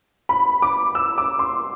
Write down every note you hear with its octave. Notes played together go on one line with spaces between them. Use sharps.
B5
D6
E6
D6
C6